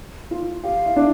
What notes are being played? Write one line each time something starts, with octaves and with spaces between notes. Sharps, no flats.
F4
G4 F5
E4
D4